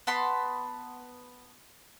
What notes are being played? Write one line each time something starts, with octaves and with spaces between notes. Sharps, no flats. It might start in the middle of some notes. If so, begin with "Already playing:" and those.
B3 A5 B5 C6